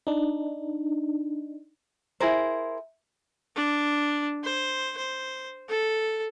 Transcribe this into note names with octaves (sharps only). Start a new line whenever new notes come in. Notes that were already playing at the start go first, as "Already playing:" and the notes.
D4 D#4
E4 G#4 A#4 C5
D4
C5
C5
A4